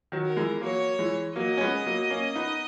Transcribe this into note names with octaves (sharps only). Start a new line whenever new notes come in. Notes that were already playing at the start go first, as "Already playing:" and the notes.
D#3 F#3
A#4
E3 G#3
F#3 A#3 C#5
E3 G#3
F#3 A#3 D#5
C#4
G#3 B3
F#3 A#3
A#3 C#4
B3 D#4